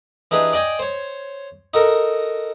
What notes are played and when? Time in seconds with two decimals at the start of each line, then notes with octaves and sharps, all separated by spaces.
0.31 E3 D4 D#4 G4 G#4 B4
0.53 D5 D#5 G5 G#5
0.79 C5 C#5
1.74 D#4 F#4 A4 A#4